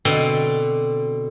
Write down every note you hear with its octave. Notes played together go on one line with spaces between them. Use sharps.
B2 D3 C4